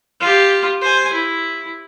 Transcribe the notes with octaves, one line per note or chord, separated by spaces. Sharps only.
F4 G4
C5 G#5
E4